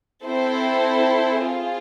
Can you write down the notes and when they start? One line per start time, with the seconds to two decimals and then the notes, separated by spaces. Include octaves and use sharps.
0.24 C4 E4 A4 C5
1.41 F4 G#4 C5